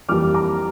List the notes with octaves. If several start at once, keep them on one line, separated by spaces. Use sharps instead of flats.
F2 E3 G3 A#3 D6 F6
A#5 D6